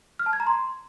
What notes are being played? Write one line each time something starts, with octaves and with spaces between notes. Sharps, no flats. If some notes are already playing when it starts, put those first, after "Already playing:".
F6
A5
G#6
A#5
C6